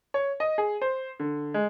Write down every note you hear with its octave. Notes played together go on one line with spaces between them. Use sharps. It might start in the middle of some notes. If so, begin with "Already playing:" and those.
C#5
D#5
G#4
C5
D3
G#3